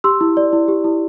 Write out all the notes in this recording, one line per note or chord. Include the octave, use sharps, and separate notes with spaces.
G4 C6 E6
E4
D5
E4
G4
E4